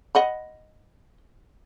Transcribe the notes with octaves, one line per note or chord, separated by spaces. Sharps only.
D#5 F#5 B5